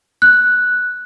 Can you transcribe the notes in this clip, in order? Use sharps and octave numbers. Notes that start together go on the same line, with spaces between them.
F#6